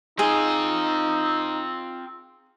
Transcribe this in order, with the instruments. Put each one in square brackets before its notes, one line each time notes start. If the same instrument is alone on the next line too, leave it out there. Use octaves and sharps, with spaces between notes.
[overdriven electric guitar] C4 F4 [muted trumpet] D#4 [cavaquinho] G#4